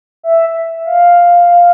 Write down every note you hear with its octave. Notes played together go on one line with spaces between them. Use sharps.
E5
F5